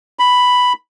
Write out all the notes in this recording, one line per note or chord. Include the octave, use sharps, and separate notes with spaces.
B5